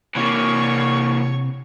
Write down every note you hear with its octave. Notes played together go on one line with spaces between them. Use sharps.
C3 E3 A#3 C#5 C#6